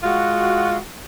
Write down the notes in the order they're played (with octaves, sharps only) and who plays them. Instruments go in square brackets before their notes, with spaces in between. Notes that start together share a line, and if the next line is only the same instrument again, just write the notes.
[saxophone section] G#3 F4 F#4